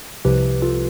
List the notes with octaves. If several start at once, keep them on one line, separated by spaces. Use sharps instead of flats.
C2 C3 F3 G4 B4
F4 A4